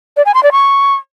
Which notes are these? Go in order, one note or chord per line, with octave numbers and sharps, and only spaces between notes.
D5
G#5
C6
D5
C#6